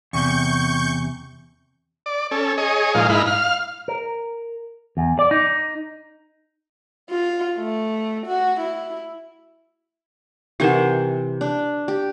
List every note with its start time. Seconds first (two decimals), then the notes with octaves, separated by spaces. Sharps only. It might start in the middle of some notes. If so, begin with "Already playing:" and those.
0.13 E2 C3 C#6 G6
2.06 D5
2.31 C#4 A4
2.58 G#4 C#5 D#5
2.95 A#2 F3 G#3 D#4 F5
3.09 G#2 D#4 E4 B5 F6
3.27 F5 F6
3.88 A#4
4.97 E2
5.19 D5
5.31 D#4
7.10 F4
7.57 A3
8.26 F#4
8.60 E4
10.60 C3 E3 D#4 A#4 F#5 C6
11.41 D4
11.88 G4